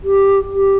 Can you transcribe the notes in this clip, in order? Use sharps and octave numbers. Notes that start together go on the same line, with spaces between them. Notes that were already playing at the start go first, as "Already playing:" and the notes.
G4
G4